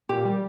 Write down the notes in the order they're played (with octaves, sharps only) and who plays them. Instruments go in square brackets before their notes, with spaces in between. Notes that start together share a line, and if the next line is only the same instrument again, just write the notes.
[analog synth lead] A#2 [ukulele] G4
[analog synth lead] G3